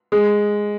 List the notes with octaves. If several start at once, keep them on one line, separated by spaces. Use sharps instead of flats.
G#3